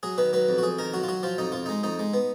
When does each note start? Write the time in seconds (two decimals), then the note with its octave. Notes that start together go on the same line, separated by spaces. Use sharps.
0.03 F#3 G#4
0.18 D#3 B4
0.33 F#3 B4
0.48 F2
0.58 F#4
0.63 F2 G#4
0.78 D#3 A#4
0.93 F#3 F#4
1.04 F4
1.08 F#3 F#4
1.23 F3 F4
1.38 F2 D#4
1.52 F2 F4
1.66 G#3 D#4
1.83 F2 D#4
1.99 G#3
2.14 B3